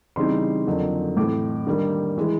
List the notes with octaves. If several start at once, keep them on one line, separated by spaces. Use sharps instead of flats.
C#3 E3 G3 C4 D#4 C6
F2 D3 F#3 A#3
A2 E3 A3 C4 D6
D#3 G3 A#3 D4
E3 G#3